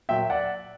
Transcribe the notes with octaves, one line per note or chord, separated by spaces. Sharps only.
A#2 F#3 E5 G5
D5 F#5